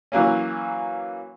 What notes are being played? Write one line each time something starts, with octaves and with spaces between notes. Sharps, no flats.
E3 F#3 A#3 C#4